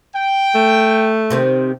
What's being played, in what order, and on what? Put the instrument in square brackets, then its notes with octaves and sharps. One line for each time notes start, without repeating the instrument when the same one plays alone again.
[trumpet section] G5
[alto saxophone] A3
[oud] C3 D#3 C4